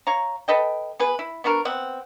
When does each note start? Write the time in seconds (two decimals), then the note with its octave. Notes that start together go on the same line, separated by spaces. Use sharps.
0.07 C#5 F5 A#5
0.48 A4 B4 D#5 G5
0.99 B3 G#4 B4
1.19 E4
1.44 B3 D4 F#4 A#4
1.65 B3 C4 F#5